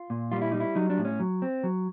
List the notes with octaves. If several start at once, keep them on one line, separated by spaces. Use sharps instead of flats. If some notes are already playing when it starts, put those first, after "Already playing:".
Already playing: F4
A#2
G3 F4
E4
G3 D#4
E4
F#3 D#4
D4
A2
C#4
F#3
C4
F#3